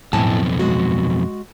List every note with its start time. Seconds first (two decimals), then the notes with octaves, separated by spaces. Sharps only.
0.13 B1 F2 A2 G#5 A5
0.59 G#3 F#4